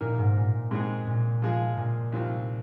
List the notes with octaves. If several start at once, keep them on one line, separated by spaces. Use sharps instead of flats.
A#2 D#3 A#3 D#4 A#4
G#2
A#2
G#2 G#3 C4 D#4 G#4
A#2
F3 G#3 F4 G#4
A#2
C2 C3 D#3 C4 F4